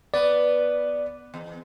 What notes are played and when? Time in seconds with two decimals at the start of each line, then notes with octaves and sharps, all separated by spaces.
0.14 B3 D5
1.34 E2